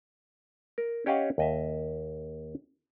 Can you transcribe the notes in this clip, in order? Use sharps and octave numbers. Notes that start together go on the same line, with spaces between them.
A#4
C#4 G4 C#5 D#5 F5 F#5
D#2 D#5 E5